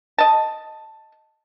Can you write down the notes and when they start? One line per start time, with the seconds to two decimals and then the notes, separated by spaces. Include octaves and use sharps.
0.18 D#5 A5